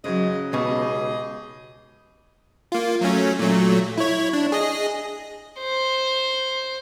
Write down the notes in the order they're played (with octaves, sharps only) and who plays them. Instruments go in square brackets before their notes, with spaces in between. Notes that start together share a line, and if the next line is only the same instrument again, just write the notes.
[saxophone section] G#2 G#3 D#5 [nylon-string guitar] C#3 F#3
[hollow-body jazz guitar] C#2 B2 [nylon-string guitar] D#4 [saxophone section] G4 G#4 D#5
[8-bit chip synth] A#3 F4
F#3 A3 C#4
A#2 F#3 A3
E4 C#5
D4
G#4 D#5
[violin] C5